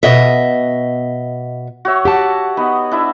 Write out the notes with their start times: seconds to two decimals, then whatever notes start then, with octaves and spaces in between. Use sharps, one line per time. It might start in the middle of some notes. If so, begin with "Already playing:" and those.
0.03 B2 D#5 E5
1.85 F#4 C#5 E5
2.05 G4 F#5 A5
2.57 B3 D#4
2.92 D4 E4 E5